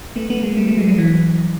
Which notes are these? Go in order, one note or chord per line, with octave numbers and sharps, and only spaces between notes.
A3 B3
A3 B3
G#3 A#3
G3 A3
G3 A3
F#3 G#3
F#3 G#3
E3 F#3